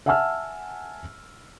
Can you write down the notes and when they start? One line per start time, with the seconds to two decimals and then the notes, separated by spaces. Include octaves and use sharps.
0.06 E5 F#5 G#5 A5 E6 F6